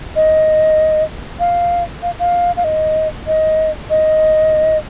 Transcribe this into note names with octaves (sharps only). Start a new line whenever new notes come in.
D#5
F5
F5
F5
F5
D#5
D#5
D#5